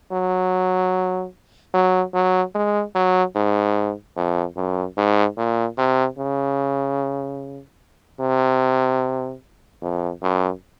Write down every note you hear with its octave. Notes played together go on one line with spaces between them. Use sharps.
F#3
F#3
F#3
G#3
F#3
G#2
F2
F#2
G#2
A#2
C3
C#3
C3
F2
F#2